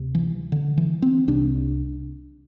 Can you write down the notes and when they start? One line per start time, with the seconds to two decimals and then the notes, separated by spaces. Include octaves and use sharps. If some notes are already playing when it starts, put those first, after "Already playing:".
Already playing: D2 C3
0.15 E3
0.52 D3
0.78 E3
1.02 C4
1.28 C2 C3 D4